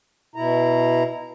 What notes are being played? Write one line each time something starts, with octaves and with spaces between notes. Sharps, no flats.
B2 E4 A#5